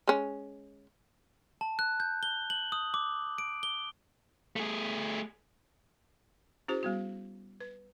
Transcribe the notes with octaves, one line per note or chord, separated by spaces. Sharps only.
G#3 C#4
A5
F#6
G6
G7
F#7
D#6
D6
D7
G7
A3 G#4
C#4 E4 F#4 G#4 C5
G3 B3 F#4
B4